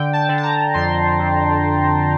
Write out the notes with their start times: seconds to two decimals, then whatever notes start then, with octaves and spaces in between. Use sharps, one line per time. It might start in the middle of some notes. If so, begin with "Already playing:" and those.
Already playing: D3 G5
0.13 A5
0.29 D3
0.38 A5
0.43 A#5
0.74 F2 C6
1.20 F2